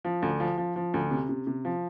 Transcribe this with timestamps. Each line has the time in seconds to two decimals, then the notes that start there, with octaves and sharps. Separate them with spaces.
0.05 F3
0.22 D2
0.40 F3
0.58 F3
0.76 F3
0.94 D2
1.11 C3
1.29 C3
1.47 C3
1.65 F3